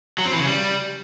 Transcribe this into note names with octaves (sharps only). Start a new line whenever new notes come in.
F#3
C4
E3
C#3
G3